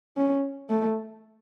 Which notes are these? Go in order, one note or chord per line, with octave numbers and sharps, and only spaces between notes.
C#4
A3